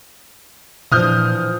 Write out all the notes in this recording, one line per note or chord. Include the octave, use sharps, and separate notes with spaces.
A#2 E3 F3 D4 D#6 F6 G6